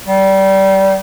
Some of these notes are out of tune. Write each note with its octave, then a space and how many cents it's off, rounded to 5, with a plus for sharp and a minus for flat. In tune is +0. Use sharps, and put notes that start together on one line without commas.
G3 -25